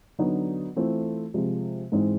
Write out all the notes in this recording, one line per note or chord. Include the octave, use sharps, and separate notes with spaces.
D3 F#3 B3 D#4 F#4
E3 A3 C4 F4 A4
C3 F3 G#3
G#2 E3 G#3 C4 D#4